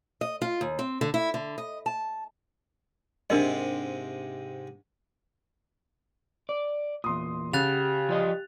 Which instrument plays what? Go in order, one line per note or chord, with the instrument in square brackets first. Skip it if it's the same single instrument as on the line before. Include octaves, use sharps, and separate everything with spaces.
[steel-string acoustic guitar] D#5
F4
D#2
C4
D3
E4
D3
D#5
A5
[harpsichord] G#2 C3 [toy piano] D4 A#4 D#5
[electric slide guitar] D5
[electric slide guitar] E2 A#2 [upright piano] C6 D#6
[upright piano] C#3 [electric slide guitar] F#4 [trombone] G4 [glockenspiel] F#6 A6 F7
[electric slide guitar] F3 G3 D#5